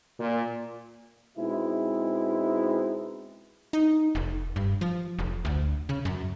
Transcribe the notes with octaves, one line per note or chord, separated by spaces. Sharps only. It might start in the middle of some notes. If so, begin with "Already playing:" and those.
A#2
B2 G#3 C4 D#4 E4
D#4
F1
G2
F3
F1
D2
C#3
F#2